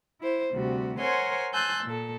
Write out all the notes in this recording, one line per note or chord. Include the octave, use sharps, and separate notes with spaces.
E4 C5
D2 C3 G3 F#4
A#4 C5 C#5 F#5 G#5 C6
G#5 A5 C6 E6 F#6 G6
A#2 A4